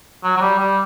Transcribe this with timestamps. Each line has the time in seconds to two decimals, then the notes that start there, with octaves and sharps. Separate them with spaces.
0.24 F#3
0.37 F#3
0.41 G3
0.59 G3